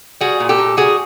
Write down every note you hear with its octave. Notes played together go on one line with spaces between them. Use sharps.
G3 F#4 G#4
A#2
G4 A4
A#2
G3 F#4 G#4